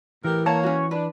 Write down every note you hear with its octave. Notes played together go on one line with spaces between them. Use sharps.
A2 E3 G4 A#4
A#3 C#5 F#5 A5 A#5
C#4 F#4
D4 B4